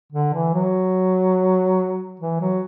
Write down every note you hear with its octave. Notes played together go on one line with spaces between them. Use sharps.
D3
E3
F#3
E3
F#3